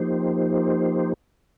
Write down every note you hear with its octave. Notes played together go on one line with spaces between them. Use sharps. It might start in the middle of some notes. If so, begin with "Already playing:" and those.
Already playing: F3 A#3 D#4 G4 C5